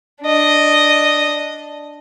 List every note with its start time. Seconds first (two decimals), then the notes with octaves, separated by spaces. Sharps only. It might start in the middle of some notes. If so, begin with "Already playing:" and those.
0.22 D4 D#5